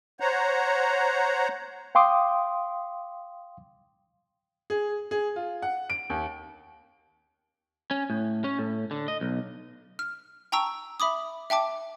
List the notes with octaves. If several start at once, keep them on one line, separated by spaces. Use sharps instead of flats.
C5 C#5 F#5 A#5
F5 G5 C6 D6 D#6
G#4
G#4
F4
F#5
D7
D#2
C#4
A2
C#4
A2
D3
D#5
B1
F6
G5 A5 A#5 C#6 E6
E5 B5 D6 D#6
E5 G5 A5 D6